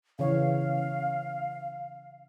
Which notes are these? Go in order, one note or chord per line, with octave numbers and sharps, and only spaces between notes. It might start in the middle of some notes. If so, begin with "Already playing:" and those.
C#3 E3 C#5 F5